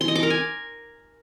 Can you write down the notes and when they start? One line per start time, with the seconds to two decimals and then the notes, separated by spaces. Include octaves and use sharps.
0.01 C6
0.08 D#5
0.16 D6
0.23 A#4
0.30 G#5